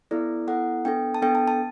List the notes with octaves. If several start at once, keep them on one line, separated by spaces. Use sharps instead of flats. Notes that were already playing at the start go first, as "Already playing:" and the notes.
B3 E4 A4 D5
B3 E4 A4 F#5
B3 D4 A4 G5
A5
B3 D4 A4 G5
A5
A5